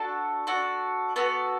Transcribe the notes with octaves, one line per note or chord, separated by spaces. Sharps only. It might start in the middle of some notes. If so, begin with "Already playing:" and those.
Already playing: D4 F#4 A4 A5
D4 F#4 A4
B3 F#4 A4